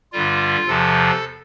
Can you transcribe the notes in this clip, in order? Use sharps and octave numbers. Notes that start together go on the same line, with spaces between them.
G2 D3 G3 F4
E2 C3 F3 A4